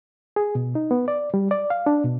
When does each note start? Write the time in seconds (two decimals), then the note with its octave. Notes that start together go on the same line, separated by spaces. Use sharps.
0.36 G#4
0.55 B2
0.75 D#4
0.91 B3
1.08 D5
1.34 G3
1.51 D5
1.70 F5
1.86 D4
2.04 B2